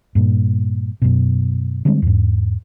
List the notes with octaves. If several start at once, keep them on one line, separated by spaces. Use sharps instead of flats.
G2 A#2
F#2 B2
D3 G3 G#3 C4
E2 G#2